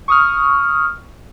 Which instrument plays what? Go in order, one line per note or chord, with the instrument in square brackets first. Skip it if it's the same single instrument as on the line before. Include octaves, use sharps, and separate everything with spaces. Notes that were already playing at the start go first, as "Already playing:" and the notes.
[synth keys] C#6 D#6 F6